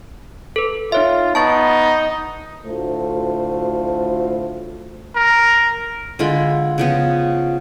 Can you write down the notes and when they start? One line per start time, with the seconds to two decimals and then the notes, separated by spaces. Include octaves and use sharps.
0.56 A4 B4
0.92 D#4 F4 C#5 E5
1.35 B3 D#4 A5 C#6 A6
2.66 D2 A2 A3 F4 F#4 C5
5.16 A#4
6.19 D3 G#3 F4 B5
6.78 C#3 F3 B3